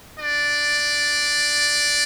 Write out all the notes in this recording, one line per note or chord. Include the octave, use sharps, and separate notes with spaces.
D4 D5